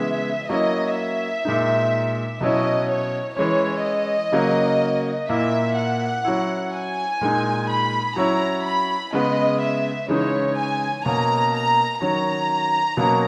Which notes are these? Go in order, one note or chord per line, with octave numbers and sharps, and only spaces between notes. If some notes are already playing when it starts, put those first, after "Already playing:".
Already playing: C#3 E3 G#3 B3 E5
F#3 A#3 C#4 E4 D#5
E5
A#2 G#3 D#4
B2 F#3 C#4 E4 D#5
C#5
E3 G#3 C#4 C#5
D#5
C#3 F#3 A#3
A#2 A#3 E4 E5
F#5
F#3 C#4 E4
G#5
A#2 G#3 D#4
B5
F#3 C#4 E4 A#5
B5
C#3 G#3 B3 D#5
E5
C#3 E3 G#3 D#4 C#5
G#5
B2 A#3 C#4 A#5
A#5
D#3 F#3 C#4 A#5
B2 F#3 A#3 C#4